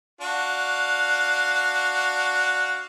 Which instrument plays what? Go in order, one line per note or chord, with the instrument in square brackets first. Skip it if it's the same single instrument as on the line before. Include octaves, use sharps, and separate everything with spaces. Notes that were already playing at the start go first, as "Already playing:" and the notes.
[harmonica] D4 F#4 F5